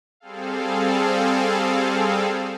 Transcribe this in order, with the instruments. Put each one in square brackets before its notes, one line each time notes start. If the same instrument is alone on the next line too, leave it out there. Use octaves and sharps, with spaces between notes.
[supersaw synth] G3 C4 G#4 A4 F5